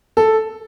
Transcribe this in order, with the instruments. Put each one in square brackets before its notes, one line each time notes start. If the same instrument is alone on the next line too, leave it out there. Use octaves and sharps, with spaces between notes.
[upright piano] A4